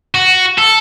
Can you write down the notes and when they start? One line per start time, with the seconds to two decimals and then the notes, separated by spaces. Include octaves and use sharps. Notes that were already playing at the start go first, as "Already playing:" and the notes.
0.15 F#4
0.58 A4